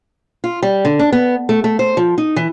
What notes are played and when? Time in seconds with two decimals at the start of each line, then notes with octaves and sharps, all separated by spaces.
0.44 F4
0.63 G3
0.85 D3
0.99 D4
1.12 B3
1.49 A3
1.64 A3
1.79 C5
1.97 F3
2.18 D#4
2.36 E3